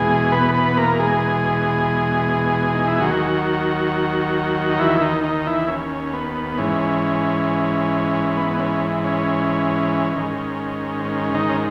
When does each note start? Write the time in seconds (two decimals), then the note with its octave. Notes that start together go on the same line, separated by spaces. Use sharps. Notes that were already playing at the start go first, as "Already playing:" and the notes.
Already playing: E2 B2 G#3 G#4
0.32 B3 B4
0.54 B3 B4
0.77 A#3 A#4
0.99 G#3 G#4
2.74 D#4
2.88 E4
3.00 D#2 D#3 F#3 F#4
4.69 D#4
4.79 E3 E4
5.01 D#3 D#4
5.24 D#3 D#4
5.46 E3 E4
5.68 C#4
6.13 B3
6.58 G#2 E3 C#4
8.37 B3
8.59 C#4
9.04 C#4
10.16 G#2 D#3
11.05 C#4
11.34 D#3 D#4
11.49 C#4